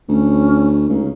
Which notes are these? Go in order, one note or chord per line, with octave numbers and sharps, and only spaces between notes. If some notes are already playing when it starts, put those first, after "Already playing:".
D2 C#4
C#2 D#4